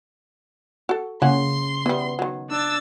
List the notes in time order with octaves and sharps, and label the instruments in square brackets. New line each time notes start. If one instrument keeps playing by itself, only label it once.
[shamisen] F#4 A4
[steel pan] C#3 [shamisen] A#3 C#4 F#5 [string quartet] C6
[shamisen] E3 G3 [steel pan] B3
[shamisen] D#3 F#3
[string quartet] D4 E6 A6